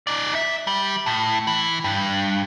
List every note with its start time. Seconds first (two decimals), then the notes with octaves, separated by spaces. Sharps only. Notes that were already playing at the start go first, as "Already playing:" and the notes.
0.07 D#4 D5
0.35 E5
0.67 G3
1.06 A2
1.47 E3
1.84 G2